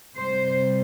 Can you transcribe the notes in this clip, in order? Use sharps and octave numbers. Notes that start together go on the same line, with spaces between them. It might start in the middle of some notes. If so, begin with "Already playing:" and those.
C3 G3 C5